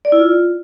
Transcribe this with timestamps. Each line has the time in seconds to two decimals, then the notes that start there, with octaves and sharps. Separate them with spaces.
0.05 D5
0.12 E4
0.20 F4